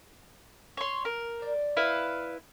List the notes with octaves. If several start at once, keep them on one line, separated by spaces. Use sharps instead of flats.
C#5 C6
A#4
C5 D5
E4 B4 F5